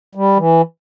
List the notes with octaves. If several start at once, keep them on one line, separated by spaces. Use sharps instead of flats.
G3
E3